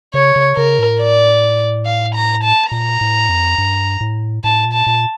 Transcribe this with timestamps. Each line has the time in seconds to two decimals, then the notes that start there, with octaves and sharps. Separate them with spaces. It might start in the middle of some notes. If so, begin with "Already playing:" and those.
0.14 C#3 C#5
0.36 C#3
0.57 C#3 A#4
0.79 A2
1.01 D5
1.85 F5
2.15 A#5
2.44 A5
2.72 A#2 A#5
3.01 A2
3.29 F2
3.58 G2
4.01 A2
4.44 A2 A5
4.65 A#2
4.73 A5
4.87 A#2